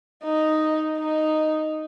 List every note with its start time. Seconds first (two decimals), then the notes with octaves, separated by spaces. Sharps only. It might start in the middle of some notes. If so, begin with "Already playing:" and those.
0.24 D#4
0.99 D#4